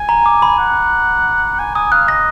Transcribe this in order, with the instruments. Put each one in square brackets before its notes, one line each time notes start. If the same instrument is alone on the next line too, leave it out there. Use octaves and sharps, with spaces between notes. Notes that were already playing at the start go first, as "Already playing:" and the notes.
Already playing: [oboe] G#5
[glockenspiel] A#5
D6
B5
[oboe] F#5
G#5
[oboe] G#5 [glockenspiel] D#6
[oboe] F5 [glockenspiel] F#6
[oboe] D#5 [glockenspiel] A#6